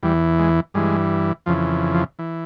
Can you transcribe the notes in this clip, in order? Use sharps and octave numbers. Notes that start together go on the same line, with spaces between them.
E2 E3 G3
G#3
G2 E3 G#3
F2 C#3 E3 F3
F3
E3